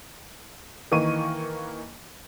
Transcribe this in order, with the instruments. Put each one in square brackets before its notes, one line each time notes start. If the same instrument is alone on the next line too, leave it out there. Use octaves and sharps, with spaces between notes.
[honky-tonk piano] D#3 E3 A#3 C#6 D#7